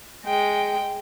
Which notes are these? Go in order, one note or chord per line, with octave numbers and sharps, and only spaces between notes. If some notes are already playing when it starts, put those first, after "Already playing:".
G#3 G5